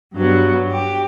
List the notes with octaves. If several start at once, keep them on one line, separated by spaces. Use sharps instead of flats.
G2 F#3 B3
G4